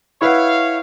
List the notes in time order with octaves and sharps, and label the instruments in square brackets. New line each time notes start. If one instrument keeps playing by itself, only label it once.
[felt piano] E4 B4 F#5 [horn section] C#5 F5